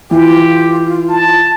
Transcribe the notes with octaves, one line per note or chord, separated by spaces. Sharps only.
E3 F4 G4
A5